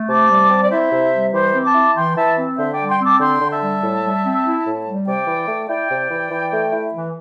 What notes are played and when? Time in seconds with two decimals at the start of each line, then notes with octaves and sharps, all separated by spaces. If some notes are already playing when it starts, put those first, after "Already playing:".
Already playing: A3
0.09 C3 A5 D6
0.30 G3
0.50 C4
0.63 D5
0.71 E4 C5 E5
0.92 C3
1.13 G3
1.33 E3 G4 C5
1.54 C4
1.64 A5 D6
1.74 E4
1.95 E3 G5 C6
2.16 E3 E5 A5
2.37 C4
2.57 D3 C5 E5
2.73 D5 G5
2.79 G3
2.88 G5 C6
2.99 C4 A5 D6
3.20 D3 G5 C6
3.41 D3
3.51 E5 A5
3.61 G3
3.82 A2
4.03 G3
4.23 C4
4.44 E4
4.65 A2
4.86 G3
5.06 C3 D5 G5
5.27 E3
5.48 A3
5.69 E4 D5 G5
5.90 C3
6.11 E3
6.31 E3
6.52 A3
6.72 E4
6.93 E3